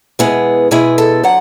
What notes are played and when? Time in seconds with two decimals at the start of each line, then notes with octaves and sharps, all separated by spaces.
0.19 B2 G#3 B3 E4 G#4
0.71 B2 G#3 B3 E4 G#4
0.98 A4
1.23 D3 F#3 F#5